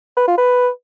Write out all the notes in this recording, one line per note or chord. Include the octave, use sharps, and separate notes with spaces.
B4
F4
B4